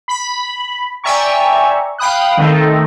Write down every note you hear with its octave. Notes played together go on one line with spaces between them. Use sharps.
B5
D5 E5 G5 G#5 A#5 C#6
F5 G5 B5 D#6 F#6
D#3 A3 C4 D#4 A4